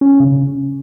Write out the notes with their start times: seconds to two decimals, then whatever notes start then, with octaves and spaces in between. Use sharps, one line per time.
0.01 C#4
0.20 C#3